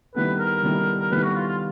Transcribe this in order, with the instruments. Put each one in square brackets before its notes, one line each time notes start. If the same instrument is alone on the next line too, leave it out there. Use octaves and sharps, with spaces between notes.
[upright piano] D#3 G3 B3 E4 A4 [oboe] B4
[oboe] A#4
[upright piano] D#3 G3 B3 E4 A4
[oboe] A#4
[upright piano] D#3 G3 B3 E4 A4 [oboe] B4
[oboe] F#4
F4
F4